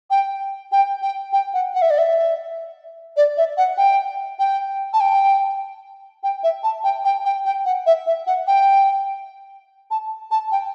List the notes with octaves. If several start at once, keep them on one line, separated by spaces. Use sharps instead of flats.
G5
G5
G5
G5
F#5
F#5
E5
D5
E5
D5
E5
F#5
G5
G5
A5
G5
G5
E5
A5
G5
G5
G5
G5
F#5
E5
E5
F#5
G5
A5
A5
G5